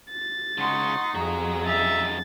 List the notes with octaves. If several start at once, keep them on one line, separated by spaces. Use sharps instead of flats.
A6
C#3 G#3 D#4 F#5 C6 C#6
F2 F#4 G#4 A#5
F#2 D#4 E5 A6